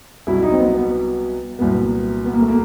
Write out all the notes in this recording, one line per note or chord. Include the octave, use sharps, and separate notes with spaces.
C2 B2 F#3 E4
D#4
C4
B3
B3
C2 A#2 F#3 B3
B3
A#3
A3
A#3